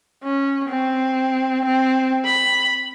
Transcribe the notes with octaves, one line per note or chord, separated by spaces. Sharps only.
C#4
C4
C4
B5